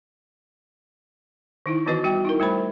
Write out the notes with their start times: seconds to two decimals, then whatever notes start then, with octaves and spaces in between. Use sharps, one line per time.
1.66 D#3 D#4 E4
1.86 D#3 E3 B3 F#4 B4 D#5
2.04 G3 F#4 G5
2.25 D#4 E4 A#4
2.40 G3 A3 C5 B5